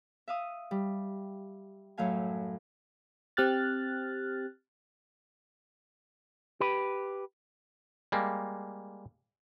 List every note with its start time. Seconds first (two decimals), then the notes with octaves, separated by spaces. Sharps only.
0.28 E5 F5 D#6
0.71 G3
1.97 F#2 A2 F#3 A3 F5 G#5
3.37 C4 G4 F6 F#6 A6
6.60 G4 B4
8.12 G3 G#3 A#3